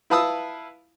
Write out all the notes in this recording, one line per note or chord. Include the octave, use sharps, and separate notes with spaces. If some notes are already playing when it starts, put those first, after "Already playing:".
E4 B4 F5 A5 D#6 E6